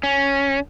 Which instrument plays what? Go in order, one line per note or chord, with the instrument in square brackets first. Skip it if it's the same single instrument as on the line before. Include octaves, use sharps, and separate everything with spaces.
[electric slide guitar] C#4